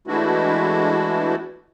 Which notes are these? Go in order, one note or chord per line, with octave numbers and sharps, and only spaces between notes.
E3 G#3 A3 D4 E4 F#4